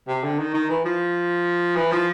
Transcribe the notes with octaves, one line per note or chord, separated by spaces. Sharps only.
C3
D3
D#3
D#3
E3
F3
E3
F3